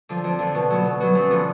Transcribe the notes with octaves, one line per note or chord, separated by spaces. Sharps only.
D3 F3
F2
D3 F3
B2
F#3 B3 F#4
B2
F#3 B3 F#4
F#2
D3 F3 B3